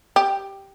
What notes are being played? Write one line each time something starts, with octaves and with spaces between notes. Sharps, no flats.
G4